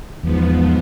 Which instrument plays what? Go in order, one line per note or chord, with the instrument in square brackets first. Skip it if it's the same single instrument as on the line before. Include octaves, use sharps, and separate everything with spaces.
[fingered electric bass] E2 [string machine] G#2 F3 B3